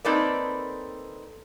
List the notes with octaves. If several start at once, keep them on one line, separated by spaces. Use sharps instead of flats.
A#3 C4 D#4 A4 B4 D5